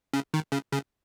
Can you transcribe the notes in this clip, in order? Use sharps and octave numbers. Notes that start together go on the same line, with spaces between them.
C#3
D#3
C#3
C#3